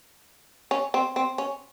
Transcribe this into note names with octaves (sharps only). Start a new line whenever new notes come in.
C#4
C4
C4
C#4